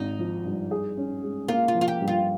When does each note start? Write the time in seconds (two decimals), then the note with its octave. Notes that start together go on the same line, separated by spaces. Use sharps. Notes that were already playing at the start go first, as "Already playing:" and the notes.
Already playing: G#1 D#4
0.19 F3
0.45 G2
0.71 G#4
0.97 C#4
1.23 G#3
1.48 A#3 F4
1.68 F4
1.75 F3
1.81 F4
1.88 G4
2.01 G2
2.08 F4